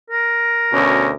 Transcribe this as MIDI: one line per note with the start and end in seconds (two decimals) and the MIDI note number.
0.10 1.12 70
0.73 1.11 38
0.73 1.11 47
0.73 1.11 61